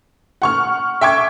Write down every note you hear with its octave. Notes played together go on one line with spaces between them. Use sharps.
F#5 C#6 F6
E5 G5 C#6 D6 G#6